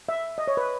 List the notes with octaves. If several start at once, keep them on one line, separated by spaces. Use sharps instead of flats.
E5
D#5
C#5
B4